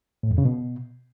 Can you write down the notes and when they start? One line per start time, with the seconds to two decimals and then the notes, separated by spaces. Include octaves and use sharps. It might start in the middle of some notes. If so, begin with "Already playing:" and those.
0.23 A2
0.31 F2
0.38 C#3
0.45 B2